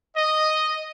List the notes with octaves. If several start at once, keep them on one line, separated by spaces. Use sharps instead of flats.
D#5